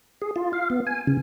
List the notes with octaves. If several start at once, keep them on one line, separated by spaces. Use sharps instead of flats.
G#4
F4
F5
B3
G#5
C#3